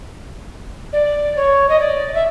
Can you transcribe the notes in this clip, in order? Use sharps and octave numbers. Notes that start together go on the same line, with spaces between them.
D5
C#5
D#5
D5
E5